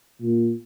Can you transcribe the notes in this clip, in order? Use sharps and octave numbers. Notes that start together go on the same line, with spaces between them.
A#2